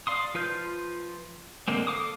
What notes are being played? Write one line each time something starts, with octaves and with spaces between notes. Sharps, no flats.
D5 F5 C6 D#6
F3 F4 B4 F6 G6
D3 G#3 A#3 C4
A4 F5 D6 D#6